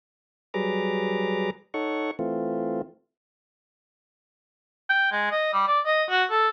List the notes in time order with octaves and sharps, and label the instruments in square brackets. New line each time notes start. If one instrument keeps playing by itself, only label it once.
[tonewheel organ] F#3 G3 G#4 B4 A#5 D6
D#4 A4 C#5 F#5 C#6
E3 A3 C4 F4
[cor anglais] G5
G#3
D#5
G3
D5
D#5
F#4
A4